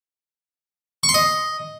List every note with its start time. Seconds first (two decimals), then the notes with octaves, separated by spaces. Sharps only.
1.03 C#6
1.09 C6
1.14 D#5